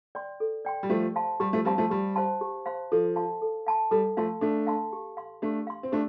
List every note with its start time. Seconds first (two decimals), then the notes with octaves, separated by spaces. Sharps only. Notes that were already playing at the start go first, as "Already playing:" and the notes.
0.15 D5 G5 C6
0.40 A4
0.65 D5 G5 C6
0.83 G3
0.90 F3 A3 G4
1.15 C5 F5 A5 C6
1.40 G3 G4
1.53 F3 A3
1.65 G3 C4 C5 F5 A5 C6
1.78 F3 A3
1.90 G3 G4
2.16 C5 F5 A5 C6
2.41 G4
2.66 C5 F5 A5 C6
2.92 F3 A4
3.16 F5 A5 C6
3.42 A4
3.67 F5 A5 C6
3.91 G3 A4
4.17 F3 A3 F5 A5 C6
4.41 A3 D4 A4
4.67 F5 A5 C6
4.93 G4
5.17 F5 C6
5.42 A3 D4 G4
5.67 F5 C6
5.83 C4
5.92 A3 D4 G4